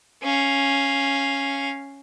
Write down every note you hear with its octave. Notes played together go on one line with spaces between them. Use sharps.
C#4 F5